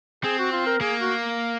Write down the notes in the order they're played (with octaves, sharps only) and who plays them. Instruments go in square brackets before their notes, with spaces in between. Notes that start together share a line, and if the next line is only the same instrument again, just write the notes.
[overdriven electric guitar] C4 [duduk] G#4
[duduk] F#4
F4
A#4
[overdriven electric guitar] A#3 [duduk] G#4
[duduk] F#4